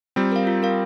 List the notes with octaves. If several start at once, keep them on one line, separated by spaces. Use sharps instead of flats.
G3 C4 F4
A#4 F5
F4
A#4 F5